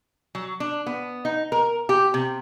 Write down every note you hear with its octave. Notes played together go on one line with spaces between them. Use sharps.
F#3
D4
B3
D#4
A#4
G4
C3